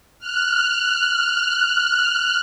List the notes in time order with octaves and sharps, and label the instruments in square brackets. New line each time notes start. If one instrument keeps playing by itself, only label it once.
[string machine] F6 F#6